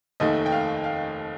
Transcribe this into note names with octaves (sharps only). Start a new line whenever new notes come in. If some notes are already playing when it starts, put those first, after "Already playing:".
F1 D#2 D#3 A3 D#5
G5
F5
F5